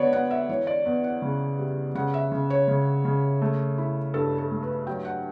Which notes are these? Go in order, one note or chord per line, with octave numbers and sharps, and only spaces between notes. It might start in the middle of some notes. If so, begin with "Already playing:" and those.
Already playing: D3 F#3 B3 C#5 D5
B3 F#5
E5
E3 C#5
D5
E2 F#5
F#5
C#3
G3
C#3 F#5
E5
C#3
C#5
C#3
C#3
A3
E4
G2 A4
A4
A3
B4
F#3 G5
F#5